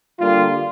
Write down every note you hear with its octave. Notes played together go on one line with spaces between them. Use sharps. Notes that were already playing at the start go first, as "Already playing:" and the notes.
D3 G3 A#3 F4